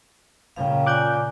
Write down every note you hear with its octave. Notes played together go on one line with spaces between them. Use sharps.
A#2 C#3 F5 G5
F4 D5 G#5 D6 F#6 G6